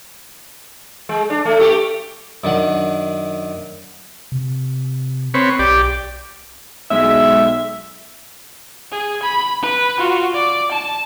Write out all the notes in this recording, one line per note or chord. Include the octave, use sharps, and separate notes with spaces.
G#3
D4
A3
A3 G4
F#2 D#3 D4 F#5
C3
C4 B4 C#5
B1 G4 D5
B1 G#3 E5 B6
G#4
B5
B4
F4 F#4
D5
A5